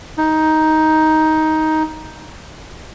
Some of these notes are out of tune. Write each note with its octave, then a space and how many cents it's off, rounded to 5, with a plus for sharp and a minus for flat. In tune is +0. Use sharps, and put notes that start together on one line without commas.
D#4 +10